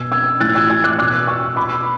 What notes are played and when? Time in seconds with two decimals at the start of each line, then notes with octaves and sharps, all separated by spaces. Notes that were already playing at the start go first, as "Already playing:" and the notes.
Already playing: B2 E6 G#6
0.12 E6 G#6
0.40 A2 E3 F#6 A6
0.55 E6 G#6
0.70 E6 G#6
0.84 D6 F#6
0.99 B2 D6 F#6
1.27 C#6 E6
1.56 B2 B5 D6